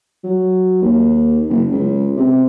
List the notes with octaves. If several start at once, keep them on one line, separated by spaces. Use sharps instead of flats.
F#3
D#2
F#1
C#2
C3